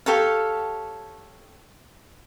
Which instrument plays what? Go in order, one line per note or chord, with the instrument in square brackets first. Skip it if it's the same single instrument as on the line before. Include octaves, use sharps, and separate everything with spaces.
[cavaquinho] G4 A4 C#5 F5